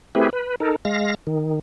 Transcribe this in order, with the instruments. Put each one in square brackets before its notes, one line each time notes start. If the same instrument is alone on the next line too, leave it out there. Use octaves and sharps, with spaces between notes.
[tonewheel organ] A3 C4 E4 G4 G#4 B4
B4
D#4 A4 A#4
G#3 F5 A#6
D#3